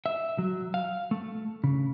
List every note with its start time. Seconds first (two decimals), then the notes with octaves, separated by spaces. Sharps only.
0.06 E5
0.38 F#3
0.74 F5
1.11 A3
1.64 C#3